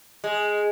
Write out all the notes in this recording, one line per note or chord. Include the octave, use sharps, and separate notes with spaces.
G#3